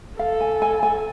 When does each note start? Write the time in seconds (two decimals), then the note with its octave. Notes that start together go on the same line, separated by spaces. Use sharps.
0.19 A4 F5
0.41 G#5
0.62 G#5
0.83 G#5